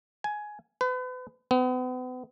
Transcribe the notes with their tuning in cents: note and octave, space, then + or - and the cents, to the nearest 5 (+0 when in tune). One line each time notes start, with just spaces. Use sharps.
G#5 +15
B4 +35
B3 +40